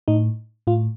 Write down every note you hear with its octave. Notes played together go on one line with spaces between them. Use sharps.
A2 D#4
A2 F4